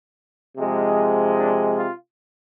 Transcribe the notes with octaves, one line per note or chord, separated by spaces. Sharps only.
C3 F3 G#3
D4
F4